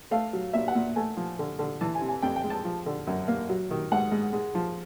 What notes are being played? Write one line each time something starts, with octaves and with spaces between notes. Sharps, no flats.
A3 F5
F#3
A#2 E5
F#5
A#2
A3 G#5
F3
D3
D3
E3 A5
G#5
C3
G#5
F2 G5
G5
G#3
A5
F3
D3
F#2
A#3
F#3
D#3
G#2 F#5
G#2
G#3
F3